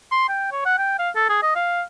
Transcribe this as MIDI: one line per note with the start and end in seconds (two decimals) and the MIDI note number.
0.12 0.29 84
0.29 0.48 79
0.52 0.62 73
0.65 0.78 78
0.78 0.97 79
0.99 1.10 77
1.15 1.25 69
1.29 1.38 68
1.43 1.55 75
1.55 1.82 77